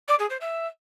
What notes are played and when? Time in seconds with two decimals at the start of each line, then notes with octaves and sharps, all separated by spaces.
0.08 D5
0.19 G#4
0.29 C5
0.40 E5